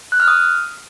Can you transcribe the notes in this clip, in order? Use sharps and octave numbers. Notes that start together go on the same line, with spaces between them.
F#6
F6
D#6